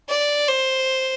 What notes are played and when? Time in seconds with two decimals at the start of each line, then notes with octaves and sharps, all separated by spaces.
0.09 D5
0.48 C5